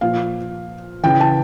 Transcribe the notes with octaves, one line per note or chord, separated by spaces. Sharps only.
A#2 F3 F5
C#3 E3 G5
A5